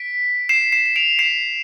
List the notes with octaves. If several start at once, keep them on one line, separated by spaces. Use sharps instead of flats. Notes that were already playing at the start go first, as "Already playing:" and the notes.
Already playing: B6 D7
C7 E7
C7 E7
E7
D7 F7
C7 E7